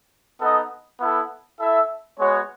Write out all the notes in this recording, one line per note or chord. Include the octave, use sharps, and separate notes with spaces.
B3 D#4 A4 D#5
B3 E4 A4
E4 A4 E5
G#3 B3 F#4 C#5